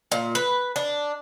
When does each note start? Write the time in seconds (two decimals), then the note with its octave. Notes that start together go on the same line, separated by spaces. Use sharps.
0.12 A#2
0.35 B4
0.76 D4